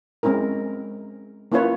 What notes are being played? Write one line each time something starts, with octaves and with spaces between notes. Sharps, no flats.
G#3 C4 C#4 E4 A#4
A#3 C#4 E4 F4 B4 C#5